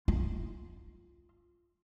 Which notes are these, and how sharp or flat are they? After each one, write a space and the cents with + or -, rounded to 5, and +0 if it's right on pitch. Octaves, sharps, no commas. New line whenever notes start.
F4 -5